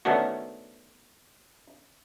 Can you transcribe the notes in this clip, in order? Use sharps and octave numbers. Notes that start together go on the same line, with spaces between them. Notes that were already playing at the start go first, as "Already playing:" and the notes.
D#3 A3 B3 C#4 D4 F#4